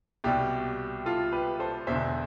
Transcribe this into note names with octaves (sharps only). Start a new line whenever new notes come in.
C2 B2 G3 G4
F4 A4
G4 B4
A4 C5
E1 E2 D3 C5 E5